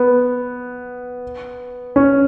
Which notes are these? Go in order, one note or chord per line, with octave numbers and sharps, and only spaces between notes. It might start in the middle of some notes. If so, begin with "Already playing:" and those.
Already playing: B3
C#4